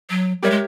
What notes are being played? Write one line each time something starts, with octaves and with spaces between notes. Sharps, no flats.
F#3
G3 G4 A#4 C#5 E5
G#3